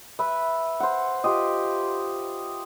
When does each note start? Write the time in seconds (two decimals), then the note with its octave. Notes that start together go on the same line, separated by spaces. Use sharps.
0.19 B4 E5
0.80 C5 F#5
1.24 F4 G4 D#5